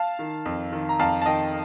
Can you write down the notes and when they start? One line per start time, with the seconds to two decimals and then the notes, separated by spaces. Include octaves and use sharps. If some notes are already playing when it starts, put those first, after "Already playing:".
Already playing: F5 A5
0.19 D#3
0.45 F2
0.72 D#3
0.89 A#5
0.99 F2 F5 A5
1.22 A5
1.26 D#3 D#5 G5